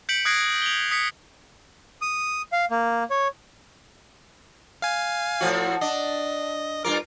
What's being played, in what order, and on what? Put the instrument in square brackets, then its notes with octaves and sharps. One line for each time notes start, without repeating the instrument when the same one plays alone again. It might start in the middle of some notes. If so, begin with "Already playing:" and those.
[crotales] G6 B6 C#7 D7 F#7
D#6 F#6 G#6 A#6 C7 D7
F7 G7
D#6 B6 C#7
[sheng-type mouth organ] D#6
F5
A#3
C#5
[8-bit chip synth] F5 G#5
[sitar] A2 F3 F#4
[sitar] D4 [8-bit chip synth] D#5
[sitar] G2 F4 A#4 [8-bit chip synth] D6